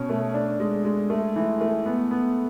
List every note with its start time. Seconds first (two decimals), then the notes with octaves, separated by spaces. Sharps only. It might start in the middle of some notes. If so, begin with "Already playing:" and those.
Already playing: B2 C#4
0.09 A3
0.34 D4
0.60 G#3
0.85 G#3
1.10 A3
1.36 E3
1.61 A3
1.86 B3
2.11 B3